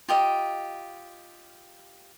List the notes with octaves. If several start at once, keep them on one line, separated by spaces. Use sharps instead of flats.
F4 G4 D#5